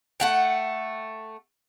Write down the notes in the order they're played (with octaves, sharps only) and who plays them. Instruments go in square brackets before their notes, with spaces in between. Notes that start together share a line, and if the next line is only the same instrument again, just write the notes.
[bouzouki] A3 F#5 G5